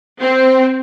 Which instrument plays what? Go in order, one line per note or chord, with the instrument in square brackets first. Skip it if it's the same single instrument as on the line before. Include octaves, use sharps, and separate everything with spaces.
[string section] C4